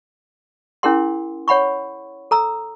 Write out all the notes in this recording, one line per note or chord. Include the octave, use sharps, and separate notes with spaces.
C#4 E4 G#4 A#4 F#5 C6
C#5 F#5 B5 C#6
A4 A#5 E6